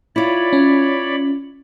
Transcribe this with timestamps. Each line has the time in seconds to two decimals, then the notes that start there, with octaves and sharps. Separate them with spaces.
0.16 E4 F4 C#5 D5 B5
0.53 C#4